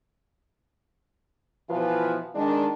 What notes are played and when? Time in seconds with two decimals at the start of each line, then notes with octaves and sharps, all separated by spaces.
1.69 B2 E3 F3 F4 B4
2.35 D#3 G#3 D4